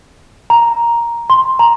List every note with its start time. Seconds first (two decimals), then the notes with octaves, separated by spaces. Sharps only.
0.50 A#5
1.30 C6
1.59 A#5